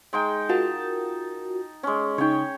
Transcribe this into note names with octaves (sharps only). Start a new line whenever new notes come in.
G#3 D#4 G5
F4 F#4 A#4 A5
G#3 C#4
C#3 D#4 C#5 G5